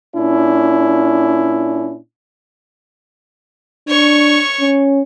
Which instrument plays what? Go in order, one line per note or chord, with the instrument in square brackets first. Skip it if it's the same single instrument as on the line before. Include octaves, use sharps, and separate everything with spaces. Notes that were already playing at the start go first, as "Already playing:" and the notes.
[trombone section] A#2 C#4 D4 E4
[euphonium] D4 [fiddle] C#5 C#6
[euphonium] C#4